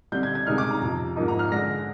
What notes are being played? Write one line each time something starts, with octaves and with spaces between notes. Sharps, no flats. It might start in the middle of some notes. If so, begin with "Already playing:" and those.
D3 G3 C4 G6
G#6
G#6
C3 D#3 G#3 D#4 F6
D6
A#5
F2 C3 F3
G#2 F3 A#3 D#4
A#5
F6
D3 G#3 D4 A#6